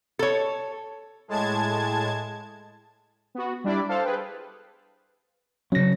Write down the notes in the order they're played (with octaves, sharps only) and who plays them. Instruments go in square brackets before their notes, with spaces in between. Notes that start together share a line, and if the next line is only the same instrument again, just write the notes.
[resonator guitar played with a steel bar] A4 C#5
[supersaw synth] A2 G#3 A5 G#6
[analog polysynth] B3 F#4
G3 D4 E4 D5
A4 C5 F5 A5
G#4 B4 G5
[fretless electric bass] C#3 C#4 [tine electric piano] F#3 A#6